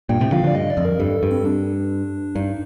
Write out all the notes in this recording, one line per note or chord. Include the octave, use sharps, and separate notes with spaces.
G2 A#2 G5
A2 C3
D3 F3 F5
D3 F3
D5
G2 D#5
D5
F2
A#4
G2 A4
G2
C4
D4
G2 D#4